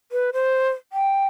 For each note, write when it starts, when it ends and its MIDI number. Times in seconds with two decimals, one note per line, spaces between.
0.12 0.31 71
0.33 0.69 72
0.93 1.27 79